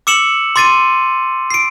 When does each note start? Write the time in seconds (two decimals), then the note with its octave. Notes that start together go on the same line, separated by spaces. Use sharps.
0.07 D6 E6 C#7 E7 F#7
0.56 C6 D6 A6 C7 D#7
1.50 C7 D7